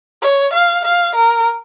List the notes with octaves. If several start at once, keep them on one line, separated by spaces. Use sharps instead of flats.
C#5
F5
F5
A#4